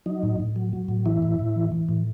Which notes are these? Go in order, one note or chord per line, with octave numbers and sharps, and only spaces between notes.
F#3 D#4
A2
A2
F#3
F#3
A2
E3 E4
A2
A2
E3
E3
A2